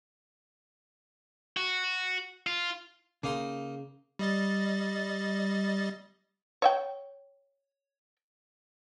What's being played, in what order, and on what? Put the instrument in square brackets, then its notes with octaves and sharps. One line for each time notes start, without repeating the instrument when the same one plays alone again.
[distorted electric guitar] F#4
F4
[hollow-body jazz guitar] C#3 [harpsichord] A#3 D#4 C6
[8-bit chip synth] G3 D#5 A6
[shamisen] C#5 E5 G5